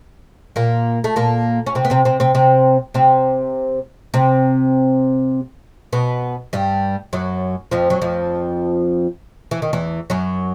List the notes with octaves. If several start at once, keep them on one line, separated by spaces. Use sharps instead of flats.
A#2 A#3
A3
A#2 A#3
C#4
C3 C4
B3
C3 C4
C3 C4
C3 C4
C3 C4
C3 C4
C3 C4
B2 B3
G2 G3
F#2 F#3
F2 F3
F#3
F2 F3
E3
D#3
E2 E3
F#2 F#3